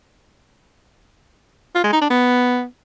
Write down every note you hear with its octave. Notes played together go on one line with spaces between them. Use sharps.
F4
G#3
D#4
D4
B3